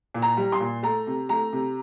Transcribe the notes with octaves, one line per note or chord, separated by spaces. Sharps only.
A#2
A#5
G3
C6
A#2
A3 A#5
C3
A3 A#5
C3